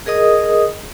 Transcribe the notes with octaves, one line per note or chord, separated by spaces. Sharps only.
G#4 A#4 D#5 D#6